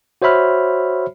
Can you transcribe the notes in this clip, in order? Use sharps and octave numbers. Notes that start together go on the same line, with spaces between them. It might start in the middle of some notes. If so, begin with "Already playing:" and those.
F#4 C5 C#5 E5 B5 F6